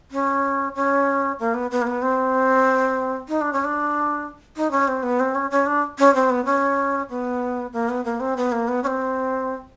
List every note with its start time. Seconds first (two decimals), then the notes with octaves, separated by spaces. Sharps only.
0.11 C#4
0.75 C#4
1.39 A#3
1.54 B3
1.71 B3
1.82 A#3
1.87 B3
2.02 C4
3.28 D#4
3.41 D4
3.53 C#4
3.64 D4
4.56 D#4
4.71 C#4
4.88 C4
5.03 B3
5.20 C4
5.35 C#4
5.51 C#4
5.66 D4
5.99 C#4
6.15 C4
6.30 B3
6.46 C#4
7.10 B3
7.73 A#3
7.89 B3
8.05 A#3
8.20 C4
8.37 B3
8.52 A#3
8.68 B3
8.84 C#4
8.87 C4